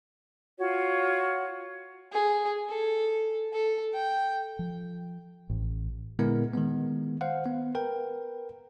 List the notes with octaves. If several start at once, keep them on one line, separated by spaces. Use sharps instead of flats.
F4 F#4 C#5
G#4
A4
A4
G5
F3
A1
A#2 D3 G#3 B3 E4 A#4
D#3 G#3 B3
C5 F5 F#5
B3
A#4 B4 G5